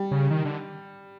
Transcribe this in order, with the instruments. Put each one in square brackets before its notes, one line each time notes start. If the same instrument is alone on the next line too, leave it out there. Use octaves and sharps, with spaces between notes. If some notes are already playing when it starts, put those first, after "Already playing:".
Already playing: [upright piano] G3
[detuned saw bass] C#3
D#3
D3